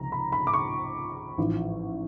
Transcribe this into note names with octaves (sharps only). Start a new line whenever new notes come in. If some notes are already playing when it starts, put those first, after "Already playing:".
Already playing: C#2 C3 F3 A#5
B5
B5
D6
C#6
A1 G#2 F3